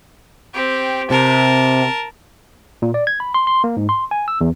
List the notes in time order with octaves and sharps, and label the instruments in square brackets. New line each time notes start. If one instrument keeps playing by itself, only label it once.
[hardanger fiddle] C4 G4
[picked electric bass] C3 [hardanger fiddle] A#4 A5
[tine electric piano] A#2
D5
G#6
B5
C6
C6
A#3
G#2
C6
G#5
E6
E2